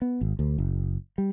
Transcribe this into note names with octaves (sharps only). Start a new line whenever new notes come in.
B3
G#1
D2
F#1
G3